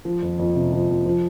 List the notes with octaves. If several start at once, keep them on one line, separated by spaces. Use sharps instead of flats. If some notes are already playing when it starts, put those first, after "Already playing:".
F3
F2
F2
C3
F3
F2
F3